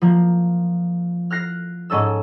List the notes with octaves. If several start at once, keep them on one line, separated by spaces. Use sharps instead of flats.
F3 A#3
F6 F#6 A#6 C7
G#2 C#4 A4 E6